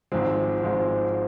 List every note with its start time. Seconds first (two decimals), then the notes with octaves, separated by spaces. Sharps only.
0.12 G#1 G#2 F3 G#3 C4
0.63 G#1 G#2 F3 G#3 C4